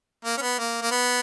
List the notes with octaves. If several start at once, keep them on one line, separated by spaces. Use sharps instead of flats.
A#3
C#4
B3
A#3
A#3
B3